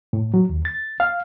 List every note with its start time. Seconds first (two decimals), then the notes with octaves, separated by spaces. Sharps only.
0.13 A2
0.34 F#3
0.49 D#2
0.65 A6
1.00 F5